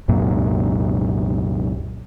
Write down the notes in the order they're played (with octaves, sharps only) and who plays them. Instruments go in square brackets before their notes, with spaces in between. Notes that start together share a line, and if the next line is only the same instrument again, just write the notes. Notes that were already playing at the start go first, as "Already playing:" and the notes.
[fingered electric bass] C2 F#2 A#2